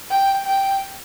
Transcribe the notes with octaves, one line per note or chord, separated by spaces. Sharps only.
G5
G5